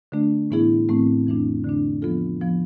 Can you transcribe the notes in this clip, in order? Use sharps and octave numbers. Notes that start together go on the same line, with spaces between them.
D3 A3 D4
A2 E3 B3 E4 G#4
A2 E3 A3 C4
F2 E3 A3 D4
D3 A3 D4
F3 B3 F4 A4
F3 B3